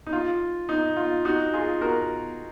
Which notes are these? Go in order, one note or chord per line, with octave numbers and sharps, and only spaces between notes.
D#4
F4
D#4
F4
D#4 F#4
F4 G#4
F#4 A#4